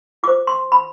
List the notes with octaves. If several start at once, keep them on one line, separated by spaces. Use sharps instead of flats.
F4 C5 D6
C6
B5